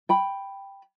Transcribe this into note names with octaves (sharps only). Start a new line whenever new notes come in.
G5 B5